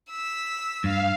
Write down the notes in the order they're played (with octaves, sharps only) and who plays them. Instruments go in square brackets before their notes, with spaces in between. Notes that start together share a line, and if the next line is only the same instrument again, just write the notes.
[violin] E6 B6
[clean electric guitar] G2 [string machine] F5